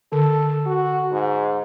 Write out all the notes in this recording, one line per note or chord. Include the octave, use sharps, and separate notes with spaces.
D3 A4
F#4
G#2